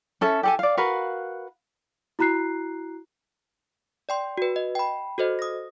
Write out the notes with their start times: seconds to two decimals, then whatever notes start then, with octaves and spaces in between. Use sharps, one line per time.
0.21 C#4 A4 E5
0.43 G4 A4 G#5
0.59 D5 F5
0.77 F#4 A#4 B4 F5
2.19 E4 F#4 A#5 F#6 C7
4.09 D5 G5 C6
4.38 F#4 B4
4.56 D#5
4.75 G5 B5
5.18 F#4 A4 C5 D#5
5.39 D#6 A#6